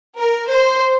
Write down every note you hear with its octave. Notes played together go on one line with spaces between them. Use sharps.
A#4
C5